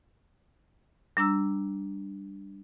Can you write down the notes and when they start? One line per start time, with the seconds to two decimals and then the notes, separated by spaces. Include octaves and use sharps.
1.17 G3 D4 A#5 E6